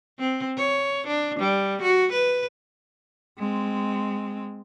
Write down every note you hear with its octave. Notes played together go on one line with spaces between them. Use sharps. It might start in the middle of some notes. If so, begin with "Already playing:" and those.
C4
C#5
D4
G3
F#4
B4
G#3 C4